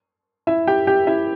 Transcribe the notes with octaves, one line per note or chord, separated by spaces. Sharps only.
E4 E5
G4 G5
G4 G5
E4 E5